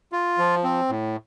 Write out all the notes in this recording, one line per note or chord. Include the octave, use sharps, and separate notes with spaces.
F4
F3
C4
A2